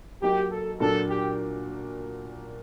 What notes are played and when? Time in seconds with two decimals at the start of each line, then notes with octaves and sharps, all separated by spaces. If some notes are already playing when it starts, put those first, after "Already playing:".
0.22 F#3 A#3 D#4 G4
0.51 A4
0.79 A#2 F#3 A#3 D4 A4
1.09 G4